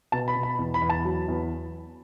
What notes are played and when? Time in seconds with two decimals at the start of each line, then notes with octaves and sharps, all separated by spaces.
0.12 B2 A5
0.28 B5
0.35 B2
0.43 B5
0.59 E2
0.74 B5
0.82 E2
0.89 A5
1.05 F#3
1.28 E2